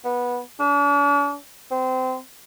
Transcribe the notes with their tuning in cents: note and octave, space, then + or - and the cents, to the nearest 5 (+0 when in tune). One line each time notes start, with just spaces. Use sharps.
B3 -15
D4 -45
C4 -25